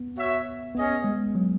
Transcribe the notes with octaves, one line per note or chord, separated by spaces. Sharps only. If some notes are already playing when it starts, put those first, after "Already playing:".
Already playing: B3
F#4 C#5 E5
B3 C#4 G#4 D#5
G#3
F#3